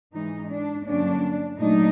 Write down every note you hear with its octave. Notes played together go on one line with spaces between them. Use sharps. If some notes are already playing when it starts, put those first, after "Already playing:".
G#2 E3 G#3 D#4
D4
G2 D3 F#3 A#3 C#4 D4
A#2 F#3 A3 D4 D#4